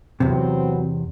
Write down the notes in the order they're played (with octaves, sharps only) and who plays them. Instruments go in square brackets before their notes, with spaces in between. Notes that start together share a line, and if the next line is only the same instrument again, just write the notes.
[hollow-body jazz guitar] E2 C3 [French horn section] F#3 B3 C4